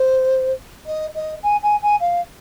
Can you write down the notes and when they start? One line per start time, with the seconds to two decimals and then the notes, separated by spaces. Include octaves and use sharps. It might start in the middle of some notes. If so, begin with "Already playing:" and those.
Already playing: C5
0.86 D#5
1.15 D#5
1.43 G#5
1.63 G#5
1.82 G#5
2.00 F5